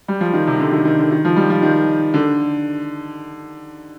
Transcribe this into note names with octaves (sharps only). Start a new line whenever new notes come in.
G3
F3
D#3
C3
D3
D#3
D#3
D3
D#3
F3
G3
F3
D#3
D3